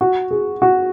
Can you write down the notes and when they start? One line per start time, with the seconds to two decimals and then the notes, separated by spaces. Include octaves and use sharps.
0.01 F#4
0.31 G#4
0.62 F#4